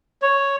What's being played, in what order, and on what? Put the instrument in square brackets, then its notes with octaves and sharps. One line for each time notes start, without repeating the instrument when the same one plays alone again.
[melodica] C#5